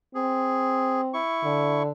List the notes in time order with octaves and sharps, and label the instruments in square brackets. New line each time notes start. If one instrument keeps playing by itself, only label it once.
[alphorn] C4 [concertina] G#4
[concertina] E4 C#6
[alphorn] D3